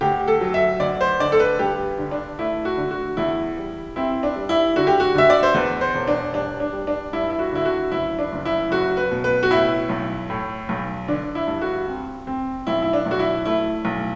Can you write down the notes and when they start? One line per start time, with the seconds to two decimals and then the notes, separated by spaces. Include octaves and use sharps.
0.01 D2 G4
0.28 A4
0.41 F#3
0.54 E5
0.80 D2 D5
1.01 C5
1.20 D3 D5
1.32 A4
1.40 B4
1.59 G2 G4
1.98 D3
2.11 D4
2.39 A3 E4
2.65 F#4
2.78 D3
2.91 F#4
3.17 E2 E4
3.57 G3
3.96 C4 E4
4.23 D4
4.36 G3
4.49 E4
4.76 D3 F#4
4.87 G4
5.00 F#4
5.15 D3 E5
5.30 D5
5.43 C5
5.54 E2 B4
5.81 C5
5.94 E1
6.08 D4
6.34 G3 D4
6.60 D4
6.73 G3
6.87 D4
7.13 G2 E4
7.30 E4
7.39 F#4
7.52 D3 E4
7.65 F#4
7.92 F#1 E4
8.19 D4
8.32 F#1
8.45 E4
8.71 F#1 F#4
8.97 B4
9.11 B2
9.24 B4
9.43 F#4
9.50 A2 E4
9.89 B1
10.30 A2
10.69 B1
11.08 D3 D4
11.35 E4
11.47 G2
11.61 F#4
11.88 C4
12.27 C4
12.67 B1 E4
12.82 E4
12.93 D4
13.06 B1
13.11 F#4
13.19 E4
13.45 A3 E4
13.85 B1